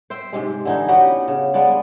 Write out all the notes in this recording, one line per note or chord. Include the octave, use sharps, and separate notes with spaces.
C5 E5 G5
G#2 C3 G#3
D3 E3 D#4
B3 C#4 F#4 G4
C#3
G#3 B3 D4 D5